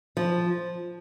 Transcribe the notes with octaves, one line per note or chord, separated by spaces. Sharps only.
F3